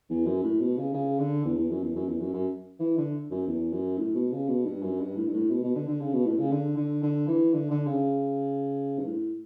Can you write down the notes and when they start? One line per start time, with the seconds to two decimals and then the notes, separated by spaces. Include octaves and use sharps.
0.10 E2
0.26 F#2
0.43 A2
0.61 B2
0.77 C#3
0.94 C#3
1.19 D3
1.45 E2
1.57 E2
1.70 F#2
1.83 E2
1.96 F#2
2.08 E2
2.21 F#2
2.34 F#2
2.79 E3
2.98 D3
3.31 F#2
3.47 E2
3.73 F#2
3.98 A2
4.15 B2
4.32 C#3
4.48 B2
4.65 G2
4.82 F#2
5.00 G2
5.16 A2
5.28 G2
5.33 A2
5.51 B2
5.64 B2
5.75 D3
5.88 D3
6.01 C#3
6.14 B2
6.26 A2
6.39 C#3
6.51 D3
6.77 D3
7.03 D3
7.28 E3
7.53 D3
7.70 D3
7.87 C#3
8.99 G2
9.05 A2